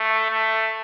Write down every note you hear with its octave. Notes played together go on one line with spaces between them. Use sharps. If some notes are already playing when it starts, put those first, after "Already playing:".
Already playing: A3
A3